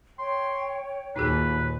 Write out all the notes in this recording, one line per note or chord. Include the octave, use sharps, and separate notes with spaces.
C#5 G5 C6
D#2 A#2 D#4 F#4 G#4 B4